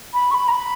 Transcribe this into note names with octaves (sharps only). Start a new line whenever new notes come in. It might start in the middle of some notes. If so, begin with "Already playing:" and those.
B5
C#6
B5
A#5
B5